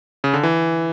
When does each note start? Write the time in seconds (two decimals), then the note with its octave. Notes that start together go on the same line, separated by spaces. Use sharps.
0.24 C#3
0.34 D3
0.43 E3